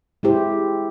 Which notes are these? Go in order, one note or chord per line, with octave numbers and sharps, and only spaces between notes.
G#3 E4 G4 C5